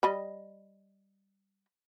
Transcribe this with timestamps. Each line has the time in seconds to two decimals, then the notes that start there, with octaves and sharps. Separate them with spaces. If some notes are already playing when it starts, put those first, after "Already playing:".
0.03 G3 D#5 B5